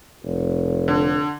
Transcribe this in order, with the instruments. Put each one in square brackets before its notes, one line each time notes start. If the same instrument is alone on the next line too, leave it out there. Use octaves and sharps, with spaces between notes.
[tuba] F1
[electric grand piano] D3